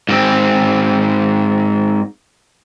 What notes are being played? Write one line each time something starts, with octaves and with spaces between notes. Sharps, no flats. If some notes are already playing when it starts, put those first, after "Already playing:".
G#2 C4